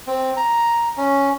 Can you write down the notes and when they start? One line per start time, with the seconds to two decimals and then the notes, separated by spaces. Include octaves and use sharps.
0.07 C4
0.37 A#5
0.97 C#4